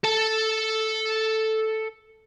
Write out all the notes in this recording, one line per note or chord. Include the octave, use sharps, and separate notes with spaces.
A4 A5